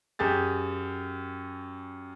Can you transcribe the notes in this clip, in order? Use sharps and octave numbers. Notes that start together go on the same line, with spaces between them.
F#2 G4 G#4 A6